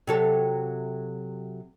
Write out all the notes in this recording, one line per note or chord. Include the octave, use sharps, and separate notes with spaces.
C3 F#3 A4